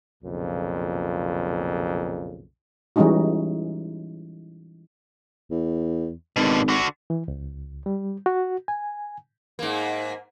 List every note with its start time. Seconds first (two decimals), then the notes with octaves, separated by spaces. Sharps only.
0.24 B1 F2 A#2 C#3
2.96 E3 G3 G#3 C#4 D#4 F#4
5.51 E2
6.36 G#1 B2 D3
6.69 D3 F#4
7.10 E3
7.28 C#2
7.86 G3
8.26 F#4
8.68 G#5
9.59 G#2 A#3